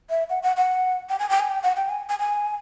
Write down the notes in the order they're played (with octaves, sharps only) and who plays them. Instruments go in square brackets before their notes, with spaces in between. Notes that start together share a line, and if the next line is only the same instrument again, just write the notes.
[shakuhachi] E5
F#5
F#5
F#5
G5
G#5
G5
G#5
G5
F#5
G5
G#5
G#5
G#5